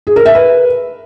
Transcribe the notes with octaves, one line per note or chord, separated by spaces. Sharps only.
G#4
A#4
E5
B4